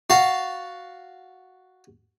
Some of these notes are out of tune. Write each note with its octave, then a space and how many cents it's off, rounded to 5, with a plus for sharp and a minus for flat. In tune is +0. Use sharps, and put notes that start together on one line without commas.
F#4 +0 F5 +0 A5 +0